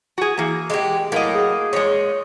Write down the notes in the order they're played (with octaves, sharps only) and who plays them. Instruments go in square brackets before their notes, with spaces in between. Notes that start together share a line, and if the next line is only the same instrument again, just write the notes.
[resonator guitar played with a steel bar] F#4 G#4
E3 A#3
[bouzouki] G#3 F#4 G4
[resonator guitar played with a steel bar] A2 F#3 D#5 [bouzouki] A#3
[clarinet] G#4
[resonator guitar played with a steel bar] A#2 G#3 [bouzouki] C#5